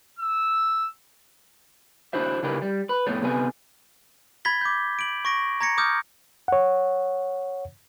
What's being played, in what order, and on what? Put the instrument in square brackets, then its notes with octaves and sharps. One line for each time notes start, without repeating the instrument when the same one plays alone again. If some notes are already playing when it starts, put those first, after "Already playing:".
[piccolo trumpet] E6
[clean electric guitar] D4 E4 F#4 C5 E5
C#3 D4 E4 G4 A#4 B4
G3
B4
F2 A2 B3 A4 C#5
C3 B3 A4 B4 G#5
[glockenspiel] B5 G#6 A6 B6 G7
D6 G6
D7 F#7
C#6 A#6 D7
A#5 G#6 A#6 C#7
A#5 D6 D#6 F6 G6
[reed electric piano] C#5 F#5